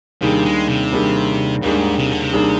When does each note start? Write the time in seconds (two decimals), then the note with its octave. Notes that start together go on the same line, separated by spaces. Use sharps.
0.21 D#2 C3 D#3 G3 D4 G#4
0.45 G#3
0.68 C3
0.92 D#2 D#3 G3 D4 G#4
1.62 D#2 G#2 D#3 G3 D4 G#4
1.98 C3
2.10 D3
2.21 C3
2.33 D#2 D#3 G3 D4 G#4